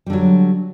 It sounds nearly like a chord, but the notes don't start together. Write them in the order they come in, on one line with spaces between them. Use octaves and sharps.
G3 D3 F#3